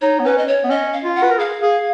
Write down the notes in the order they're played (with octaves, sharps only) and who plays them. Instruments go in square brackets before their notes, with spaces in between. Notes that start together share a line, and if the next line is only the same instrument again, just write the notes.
[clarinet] D#4 [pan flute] C#5
[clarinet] B3
[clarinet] C#4 [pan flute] B4
[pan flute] D#5
C#5
[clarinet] B3
[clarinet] C#4 [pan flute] D#5
[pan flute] F5
[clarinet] F4
[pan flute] F#5
[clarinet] B4
A#4
[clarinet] G#4 [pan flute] F5
[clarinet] G#4